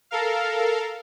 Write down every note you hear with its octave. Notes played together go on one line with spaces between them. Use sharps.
A4 A#4 F5